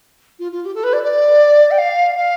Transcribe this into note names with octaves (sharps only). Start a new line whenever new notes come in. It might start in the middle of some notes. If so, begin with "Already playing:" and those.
F4
F4
G4
A4
B4
D5
D5
G5
F5
F5